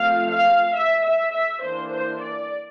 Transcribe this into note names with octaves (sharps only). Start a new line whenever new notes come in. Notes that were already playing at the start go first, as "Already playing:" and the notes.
Already playing: F3 A3 C4 F5
F5
E5
E5
E5
E3 A#3 D4 C5
C5
D5